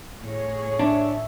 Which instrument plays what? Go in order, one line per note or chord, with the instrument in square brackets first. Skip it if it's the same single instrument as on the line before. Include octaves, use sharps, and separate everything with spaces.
[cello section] A2 G#4 C#5
[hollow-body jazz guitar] D4 [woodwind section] E5